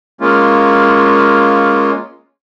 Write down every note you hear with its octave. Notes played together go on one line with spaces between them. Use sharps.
G#3 A#3 C#4 F4